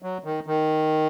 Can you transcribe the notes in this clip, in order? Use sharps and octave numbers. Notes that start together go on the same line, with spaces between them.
F#3
D#3
D#3